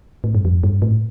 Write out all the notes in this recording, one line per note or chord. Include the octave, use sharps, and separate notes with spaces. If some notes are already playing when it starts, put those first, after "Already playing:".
A2
G2
F2
G2
A2